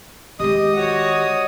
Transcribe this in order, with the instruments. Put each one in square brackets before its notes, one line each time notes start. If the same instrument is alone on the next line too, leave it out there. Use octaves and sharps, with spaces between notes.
[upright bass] D#3 G#3 [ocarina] G4 [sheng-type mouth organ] D#5 D#6
[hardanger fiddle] F#4 C#5